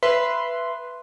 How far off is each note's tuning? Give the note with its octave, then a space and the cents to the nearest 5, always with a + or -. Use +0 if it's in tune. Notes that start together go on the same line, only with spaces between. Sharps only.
B4 +0 E5 +25 C6 -5